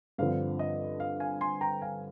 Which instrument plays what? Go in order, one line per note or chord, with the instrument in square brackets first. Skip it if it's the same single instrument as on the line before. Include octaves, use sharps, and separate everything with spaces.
[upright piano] G2 D3 F3 C4 [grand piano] F5
[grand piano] D#5
F5
F5 G#5
G#5 C6
G5 A#5
F5 G#5